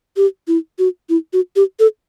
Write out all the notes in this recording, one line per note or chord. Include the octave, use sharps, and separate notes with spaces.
G4
E4
F#4
E4
F#4
G4
A4